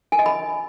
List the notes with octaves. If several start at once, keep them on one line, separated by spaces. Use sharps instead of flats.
G#5
D#5
B5